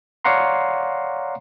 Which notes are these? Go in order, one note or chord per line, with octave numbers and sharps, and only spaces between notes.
C#5 D5 F5 F#5 A#5 C6